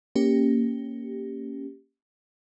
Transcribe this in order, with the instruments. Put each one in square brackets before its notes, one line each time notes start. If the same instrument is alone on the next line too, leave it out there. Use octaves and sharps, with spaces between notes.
[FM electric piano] A#3 C#4 G4